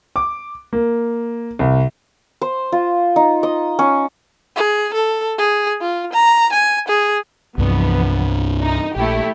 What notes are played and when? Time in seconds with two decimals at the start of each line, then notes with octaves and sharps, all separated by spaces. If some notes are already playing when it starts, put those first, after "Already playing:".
0.16 D6
0.73 A#3
1.59 C2
2.42 C5
2.72 F4
3.16 D#4
3.43 D#5
3.79 C#4
4.56 G#4
4.94 A4
5.38 G#4
5.81 F4
6.13 A#5
6.53 G#5
6.88 G#4
7.58 C2 G2 E3 F3 B3 D4
8.63 D#4
8.96 A#1 A3 E4 G4